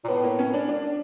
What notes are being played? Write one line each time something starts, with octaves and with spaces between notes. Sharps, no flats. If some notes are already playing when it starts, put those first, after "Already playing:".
A#2
A2 B3
A#3
C#4
D4
D4